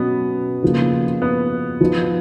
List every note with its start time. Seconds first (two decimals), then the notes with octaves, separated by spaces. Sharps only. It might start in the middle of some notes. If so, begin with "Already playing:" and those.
Already playing: B2 F#3 B3 C#4
0.63 C#3 F3 A#3
1.22 B3
1.81 F3 B3 D#4